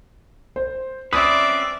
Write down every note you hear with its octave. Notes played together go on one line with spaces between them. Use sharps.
C5
C4 C#4 B4 D5 E5 D#6